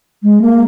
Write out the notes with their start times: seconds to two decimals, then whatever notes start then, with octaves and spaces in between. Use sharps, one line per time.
0.23 G#3
0.42 A#3